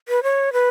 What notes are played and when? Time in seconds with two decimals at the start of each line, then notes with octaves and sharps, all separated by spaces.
0.09 B4
0.23 C#5
0.53 B4